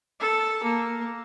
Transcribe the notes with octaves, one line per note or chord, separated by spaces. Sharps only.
A4
A#3